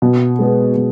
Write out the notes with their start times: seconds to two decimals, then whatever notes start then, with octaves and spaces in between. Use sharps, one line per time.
0.02 B2
0.39 G#3 B3 G#4
0.77 B2